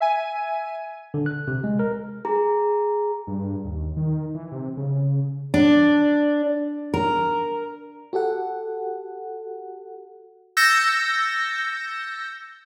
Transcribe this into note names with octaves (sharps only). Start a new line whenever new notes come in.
E5 G#5 D#7
D3
F#6
C3
G#3
A#4
G#4 A#5
G2
D#2
D#3
E3
C3
C#3
D4
A#4
F#4 G4 A4 F#5
E6 G6 A6 A#6 C#7